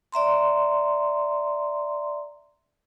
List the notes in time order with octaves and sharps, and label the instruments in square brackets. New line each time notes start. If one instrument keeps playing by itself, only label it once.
[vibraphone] D5 E5 A#5 C6